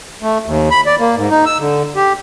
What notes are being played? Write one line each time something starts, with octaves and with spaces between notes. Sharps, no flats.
A3
D#2
B5
D5
A#3
G#2
D#4
E6
D3
G4